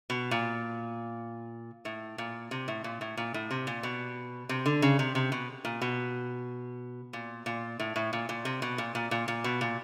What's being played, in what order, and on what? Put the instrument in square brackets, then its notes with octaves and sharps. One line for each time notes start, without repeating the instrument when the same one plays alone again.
[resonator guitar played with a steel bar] B2
A#2
A2
A#2
C3
A2
A#2
A2
A#2
A2
C3
A#2
B2
C3
D3
C#3
C3
C3
B2
A#2
B2
A#2
A#2
A2
A2
A#2
A#2
C3
B2
A#2
A#2
A#2
A#2
B2
A#2